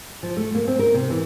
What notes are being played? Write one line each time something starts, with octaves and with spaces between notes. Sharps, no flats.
F3
A3
A#3
C4
A#4
C3
E3